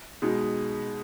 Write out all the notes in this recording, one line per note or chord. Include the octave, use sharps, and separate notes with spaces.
B2 G#3 D#4